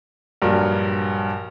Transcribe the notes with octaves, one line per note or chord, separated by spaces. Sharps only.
A#1 G2 F#3 A#4